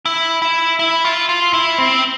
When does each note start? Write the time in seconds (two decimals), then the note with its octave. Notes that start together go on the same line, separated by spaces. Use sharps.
0.05 E4
0.42 E4
0.79 E4
1.05 F4
1.29 F4
1.53 E4
1.78 C4